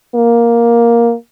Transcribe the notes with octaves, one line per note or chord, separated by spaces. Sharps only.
A#3